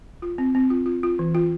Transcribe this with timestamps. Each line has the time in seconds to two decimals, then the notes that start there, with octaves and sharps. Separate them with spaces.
0.22 F4
0.38 C4
0.55 C4
0.70 F4
0.86 F4
1.03 F4
1.19 E3
1.35 F4